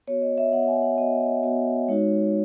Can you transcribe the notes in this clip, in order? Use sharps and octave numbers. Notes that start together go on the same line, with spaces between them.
B3 F#4 C#5
D#5
E5
B3 F#4 F#5
F#5
G#5
F#5
B3 F#4 D#5
B3 F#4
G#3 D#4 F#4 C#5